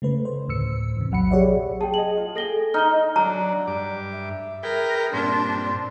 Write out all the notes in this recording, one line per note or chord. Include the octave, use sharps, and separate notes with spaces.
C#3 A3 B4
C5
D2 A2 E6 C#7
E2 C3
A#1 F#3 F#5 B5 C#7
G4 G#4 C#5 D5 E5
G#4 G5 A5
G#4 D#5 F#7
F4
G#4 A4 G5 G#5 A#6 G7
D#4 F6 G6 G7
F#3 D4 D5 A#5
G2 D6
E5
G#4 A#4 B4 G5
G2 A#2 C4 D4 C6